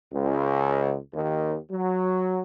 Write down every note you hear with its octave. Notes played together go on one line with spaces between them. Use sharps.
C#2
D#2
F#3